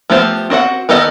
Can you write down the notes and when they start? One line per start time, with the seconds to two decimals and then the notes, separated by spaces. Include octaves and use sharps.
0.10 F3 A3 B3 G4 C5
0.50 C4 F#4 D#5 F#5
0.89 D#3 B3 G4 A4 D#5